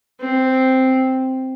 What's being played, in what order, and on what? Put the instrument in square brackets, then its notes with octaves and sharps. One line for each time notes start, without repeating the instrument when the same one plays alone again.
[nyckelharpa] C4